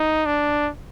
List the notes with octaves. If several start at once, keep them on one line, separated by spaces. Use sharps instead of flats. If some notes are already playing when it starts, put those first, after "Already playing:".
Already playing: D#4
D4